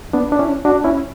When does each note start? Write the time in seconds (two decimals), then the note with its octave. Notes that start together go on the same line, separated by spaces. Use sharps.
0.13 B3 D4
0.32 D4
0.39 C#4 E4
0.65 D4 F#4
0.84 C#4 E4